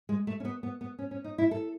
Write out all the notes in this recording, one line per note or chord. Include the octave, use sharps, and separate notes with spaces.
G#3
A3
C#4
B3
B3
B3
C#4
C#4
D#4
E4
A4